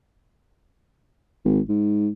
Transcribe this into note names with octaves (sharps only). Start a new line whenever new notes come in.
G#1
G#2